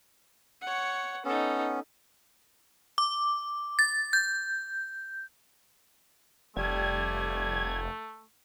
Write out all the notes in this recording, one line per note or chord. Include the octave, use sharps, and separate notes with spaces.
C#5 F#5
B3 C#4 D#4 A4
D6
A6
G6
F1 G3 A3 G#6